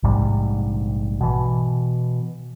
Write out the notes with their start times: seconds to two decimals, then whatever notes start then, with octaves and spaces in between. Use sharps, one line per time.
0.03 A#1 G#2 C3 G3
1.21 B2 E3